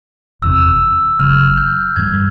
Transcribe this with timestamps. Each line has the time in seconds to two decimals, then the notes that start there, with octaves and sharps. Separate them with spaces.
0.42 F#1 E2 C3 E6
1.19 F#1 F#2 C#3 F#3 F6
1.57 G6
1.96 G2 E3 G3 G#6